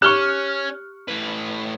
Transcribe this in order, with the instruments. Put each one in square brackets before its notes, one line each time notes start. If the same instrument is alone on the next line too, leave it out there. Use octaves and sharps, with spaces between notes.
[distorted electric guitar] C#4 [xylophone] G4 G7 [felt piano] C#6 F6 F#6
[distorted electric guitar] A2 B4